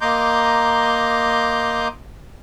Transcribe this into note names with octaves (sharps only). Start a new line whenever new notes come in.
A#3 D#5 A#5 C6 D6 G6